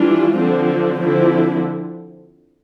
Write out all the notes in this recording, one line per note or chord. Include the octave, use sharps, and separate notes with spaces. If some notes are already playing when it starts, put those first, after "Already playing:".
Already playing: E3 G3 D4 F4
D3 F3 C4
D3 F3 C4 E4